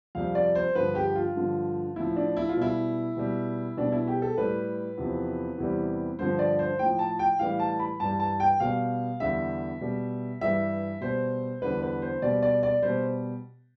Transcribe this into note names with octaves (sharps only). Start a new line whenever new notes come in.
F2 C3 G3 F5
D5
C5
G2 D3 F3 B4
G4
F4
G2 D3 F3
A2 F3 E4
D4
E4
F4
B2 G3 E4
B2 G3
B2 G3 D4
E4
G4
A4
A2 G3 B4
E2 C3 F3
E2 C3 E3 G3
G2 D3 F3 C5
D5
C5
A2 F3 G5
A5
G5
A2 E3 G3 F5
A5
B5
G2 E3 G3 A5
A5
G5
B2 G3 F5
E2 D3 G3 E5
B2 G3
G2 E3 G3 E5
B2 G3 C5
E2 D3 G3 B4
B4
C5
B2 G3 D5
D5
D5
B2 G3 C5